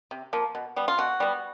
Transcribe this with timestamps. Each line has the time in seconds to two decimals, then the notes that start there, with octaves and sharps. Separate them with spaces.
0.11 C3
0.33 F3 A#3
0.55 B2
0.76 G3 B3
0.88 F4
0.98 B2 F#4
1.20 G3 B3